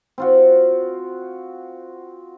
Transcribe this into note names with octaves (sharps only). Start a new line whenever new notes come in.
C4 F4 F#4